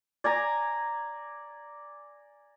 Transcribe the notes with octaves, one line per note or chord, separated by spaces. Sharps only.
D5 G#5 A#5